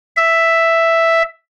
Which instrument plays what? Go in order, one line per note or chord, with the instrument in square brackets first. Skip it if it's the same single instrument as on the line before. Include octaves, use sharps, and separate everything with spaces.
[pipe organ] E5